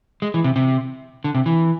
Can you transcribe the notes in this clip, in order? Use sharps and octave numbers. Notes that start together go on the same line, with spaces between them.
G#3
E3
C3
C3
D3
C3
E3